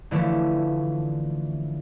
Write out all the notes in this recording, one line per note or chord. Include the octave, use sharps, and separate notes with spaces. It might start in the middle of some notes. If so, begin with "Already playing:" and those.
D3 E3 F3 A3 C#4